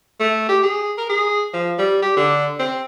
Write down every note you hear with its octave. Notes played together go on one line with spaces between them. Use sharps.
A3
G4
G#4
A#4
G#4
F3
G3
G4
D3
C4